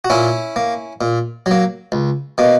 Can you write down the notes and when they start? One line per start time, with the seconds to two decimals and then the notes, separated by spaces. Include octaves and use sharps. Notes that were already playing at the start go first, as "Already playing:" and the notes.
0.05 F#4
0.10 A#2 C#4 E4
0.56 A#3
1.01 A#2
1.46 F#3 A#3
1.92 C#2
2.38 B2 A#3